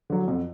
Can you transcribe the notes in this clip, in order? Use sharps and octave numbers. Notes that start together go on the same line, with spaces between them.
D3 F#3
F2